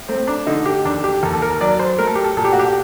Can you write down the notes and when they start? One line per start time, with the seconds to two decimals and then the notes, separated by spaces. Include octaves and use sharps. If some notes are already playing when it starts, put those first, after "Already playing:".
Already playing: A2
0.08 A3 C4
0.27 D4
0.46 D3 D#4
0.66 G4
0.85 D#2 D4
1.04 G4
1.23 D#2 A4
1.34 A4
1.42 A#4
1.61 F#3 D5
1.79 C5
1.99 A3 A#4
2.07 A4
2.16 G4
2.24 A4
2.37 A#2 A4
2.45 G4
2.52 F#4
2.59 G4